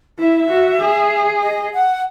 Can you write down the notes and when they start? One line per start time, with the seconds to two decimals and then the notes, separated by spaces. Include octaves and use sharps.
0.19 E4 E5
0.49 F#4
0.80 G#4
1.41 D#5
1.72 F#5